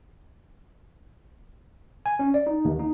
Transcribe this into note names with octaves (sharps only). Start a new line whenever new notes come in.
G#5
C#4
D5
D#4
D#2
D#4